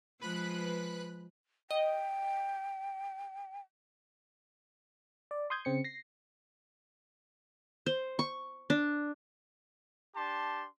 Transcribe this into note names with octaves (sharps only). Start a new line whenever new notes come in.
F3 G#3 B4 B5 F#6
D#5 G5
D5
C6 D#6 G6 G#6
C#3 C4 C#7
A#6 C7
C5
C#6
D4
D4 G4 A5 C6